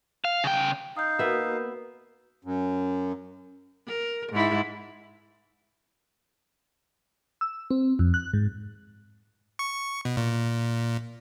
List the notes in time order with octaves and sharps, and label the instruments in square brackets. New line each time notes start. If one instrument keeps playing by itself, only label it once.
[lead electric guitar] F5
C#3 G5
[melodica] D#4 F5 [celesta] D#6 G6
[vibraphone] A#3 F#4 A#4 [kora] B3 E5
[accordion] F#2
[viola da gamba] A#4
G#2 E4
[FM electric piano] E6
C4
F2
F#6
G#2
[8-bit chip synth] C#6
B2
A#2